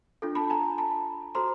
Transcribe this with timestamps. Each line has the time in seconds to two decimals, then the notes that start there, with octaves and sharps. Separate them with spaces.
0.22 D4 F4 A4
0.35 A5 B5
0.50 G#5 A#5
0.78 A5 B5
1.35 F#4 A4 C5 A#5 C6